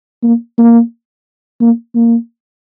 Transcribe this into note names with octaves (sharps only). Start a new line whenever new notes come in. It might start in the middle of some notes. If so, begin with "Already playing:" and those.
A#3
A#3
A#3
A#3